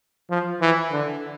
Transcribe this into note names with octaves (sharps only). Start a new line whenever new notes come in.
F3
E3
D3